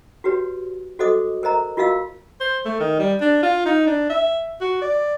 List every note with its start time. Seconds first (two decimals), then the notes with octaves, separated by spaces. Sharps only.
0.24 F#4 G4 B4 C#5
0.99 F#4 A4 C5 D#5 D6 D#6
1.43 A#4 C5 D#5 A#5
1.77 F4 F#4 A#4 D#5 F5 E6
2.40 C5
2.65 A3
2.80 D#3
2.99 G3
3.21 D4
3.43 F4
3.65 D#4
3.87 D4
4.10 E5
4.61 F#4
4.82 D5